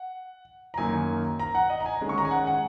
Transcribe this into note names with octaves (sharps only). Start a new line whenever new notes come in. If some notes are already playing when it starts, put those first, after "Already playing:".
Already playing: F#5
A#5
F#2 D#3 A#3 D#4 G#5
A#5
F#5
D#5
A#5
G#5
D#3 G#3 C#4
C#6
A#5
G#5
F#5
F#5